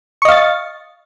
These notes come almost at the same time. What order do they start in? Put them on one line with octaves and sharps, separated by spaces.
C#6 D#5 F5 A6